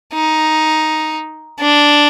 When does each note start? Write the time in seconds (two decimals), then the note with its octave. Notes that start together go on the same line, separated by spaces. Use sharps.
0.14 D#4
1.60 D4